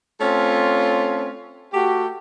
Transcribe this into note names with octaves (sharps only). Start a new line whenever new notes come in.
A3 C4 C#4 F4
A3 F#4 G4